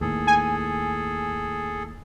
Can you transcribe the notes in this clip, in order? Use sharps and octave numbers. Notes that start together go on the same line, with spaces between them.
D#2 A2 G#4 A4
G#5